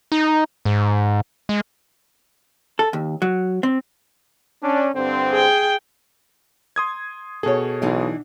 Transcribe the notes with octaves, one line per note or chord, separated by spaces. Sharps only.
D#4
G#2
G#3
A4
D#2
F#3
C4
C#4 D4
G2 D3 C4
G#4 G5
C6 D#6 G#6
B2 G#4 A4 C#5
B1 E3 D4 D#4